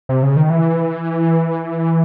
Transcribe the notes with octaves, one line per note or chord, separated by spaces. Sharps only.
C3
C#3
D#3
E3